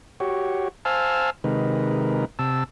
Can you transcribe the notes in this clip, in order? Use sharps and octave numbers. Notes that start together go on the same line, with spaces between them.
F#4 G4 C#5
C5 F5 G#5 A5 E6 F6
C3 D#3 G#3 D#4 A#4 B4
C3 A5 E6